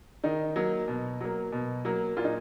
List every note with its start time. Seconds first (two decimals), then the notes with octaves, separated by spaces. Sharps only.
0.24 D#3 D#4
0.56 F#3 A#3
0.88 B2
1.21 F#3 A#3
1.52 B2
1.85 F#3 A#3
2.17 A#2 F4
2.24 D#4